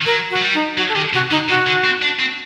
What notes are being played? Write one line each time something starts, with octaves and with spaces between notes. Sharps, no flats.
D#3
F#3 A#4
F#4
F#3
G3
D#4
F#3 F#4
A4
D#3 G4
C3 F#4
D3 D#4
C3 F#4
D3
C4
D4
C4